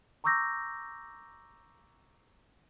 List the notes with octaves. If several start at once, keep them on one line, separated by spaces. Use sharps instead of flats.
A#5 C#6 D6 E6 G6 A#6